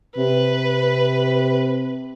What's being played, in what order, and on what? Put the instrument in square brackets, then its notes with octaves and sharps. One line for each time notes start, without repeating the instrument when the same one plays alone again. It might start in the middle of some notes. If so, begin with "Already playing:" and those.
[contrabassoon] C3 [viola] B4